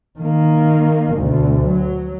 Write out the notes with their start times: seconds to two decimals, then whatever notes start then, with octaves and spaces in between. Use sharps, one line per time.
0.19 D#3 A#3
1.15 D2 B2
1.67 F#3